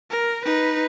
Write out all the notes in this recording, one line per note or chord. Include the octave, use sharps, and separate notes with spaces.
A#4
D#4 B4